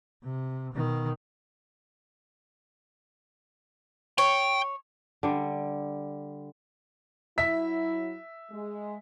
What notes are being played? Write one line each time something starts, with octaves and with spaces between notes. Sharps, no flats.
C3
B2 D#3
C#5 G5
D3 G3
F#3 E4 E5 B6
G#3